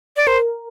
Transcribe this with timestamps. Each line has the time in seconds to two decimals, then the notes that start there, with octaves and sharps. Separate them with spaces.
0.17 D5
0.27 A#4 C5